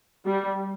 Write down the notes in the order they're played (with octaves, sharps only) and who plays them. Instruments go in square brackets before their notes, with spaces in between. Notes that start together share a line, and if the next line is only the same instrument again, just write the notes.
[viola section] G3